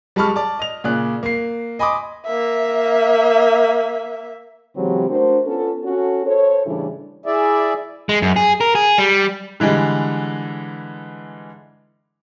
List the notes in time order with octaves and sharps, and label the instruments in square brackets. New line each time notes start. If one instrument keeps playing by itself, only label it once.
[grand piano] G3 G#3 A5 B5 C#6 F6
D5 A5
D#5 F7
A#2 C#3 D5 F#6
A#3 C7
D#5 G#5 B5 C6 D6 D#6
[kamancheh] A#3 E5
[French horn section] C#3 E3 F#3 G#3 C4 G4
A3 D4 F#4 A#4 C5
B3 C#4 F4 A4
C#4 F#4 A4
A4 C5 C#5
A2 C#3 E3 G3 D4 E4
[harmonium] E4 G#4 D5 E5
[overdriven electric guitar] G#3
F#2
G#4
A#4
G#4
G3
[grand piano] D3 E3 G3 G#3